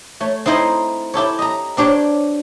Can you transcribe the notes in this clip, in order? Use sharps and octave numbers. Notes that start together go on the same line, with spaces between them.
A3 C#5
C4 D#4 E4 C5 D#5
E4 G4 A4 C#5
D#5 A#5
C4 D4 G4 C#5